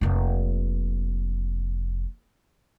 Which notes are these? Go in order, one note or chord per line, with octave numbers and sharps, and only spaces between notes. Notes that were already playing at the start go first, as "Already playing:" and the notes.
F1 A#3